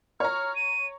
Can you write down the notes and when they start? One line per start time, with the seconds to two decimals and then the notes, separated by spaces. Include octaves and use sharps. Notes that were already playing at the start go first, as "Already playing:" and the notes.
0.20 C#5 A#5 F6
0.56 D#7